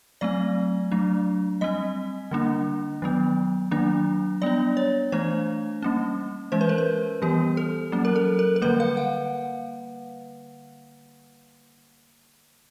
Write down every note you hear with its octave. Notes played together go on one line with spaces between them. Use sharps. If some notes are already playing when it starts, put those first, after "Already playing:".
F#3 A3 C4 D5
F#3 A3 D4
G3 C4 D#5
D3 G3 A#3 D4
D#3 F#3 B3
D#3 F#3 A#3 D4
G3 B3 D4 D5
C#5
E3 A3 D4 C5
G3 A#3 C#4
E3 G#3 C#4 C5
B4
A#4
B4
E3 G3 B3 G4
A4
F#3 A#3 C#4
A#4
A4
A#4
A#4
D3 G3 A#3 B4
F5
F#5